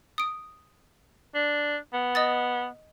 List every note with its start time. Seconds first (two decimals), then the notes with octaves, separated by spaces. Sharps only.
0.18 D#6 D7
1.35 D4
1.93 B3
2.15 D#5 D#6 A6